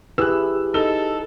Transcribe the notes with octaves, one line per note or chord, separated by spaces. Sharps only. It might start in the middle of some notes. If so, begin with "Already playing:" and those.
E4 G4 G#4 B4 E6 F#6
D#4 A4 E6 G7